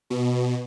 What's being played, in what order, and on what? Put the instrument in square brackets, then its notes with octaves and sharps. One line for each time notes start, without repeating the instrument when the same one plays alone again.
[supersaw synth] B2